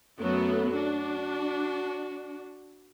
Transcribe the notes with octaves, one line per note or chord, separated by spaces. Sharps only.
F#2 F#3 A3 B3 F#4 A4
D4 F#4